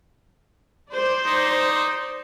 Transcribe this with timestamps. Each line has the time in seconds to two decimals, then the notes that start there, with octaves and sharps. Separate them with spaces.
0.91 C5 D5
1.26 D#4